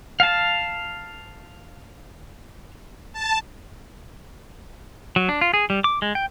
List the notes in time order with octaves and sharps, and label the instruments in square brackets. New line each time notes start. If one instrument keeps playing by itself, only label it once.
[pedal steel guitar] F5 A5
[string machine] A5
[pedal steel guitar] F#3
D4
F4
G#4
G3
D6
G#3
G5